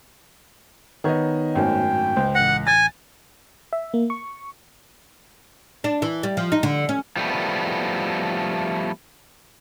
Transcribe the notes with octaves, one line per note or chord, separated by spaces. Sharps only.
D#3 B3 D#4 B4 C#5 D#5
G#1 F#2 A2 G5
C#2 C5
A1 F#5 F#6 A#6
G#5 A6
E5
A#3
C#6
D4
E3
G3
F3
D#4
D3
C#4
F3 G3 A3 B3